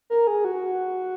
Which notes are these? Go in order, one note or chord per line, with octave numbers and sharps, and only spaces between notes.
A#4
G#4
F#4